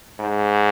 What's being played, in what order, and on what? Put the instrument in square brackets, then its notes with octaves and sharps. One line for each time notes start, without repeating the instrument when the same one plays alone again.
[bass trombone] G#2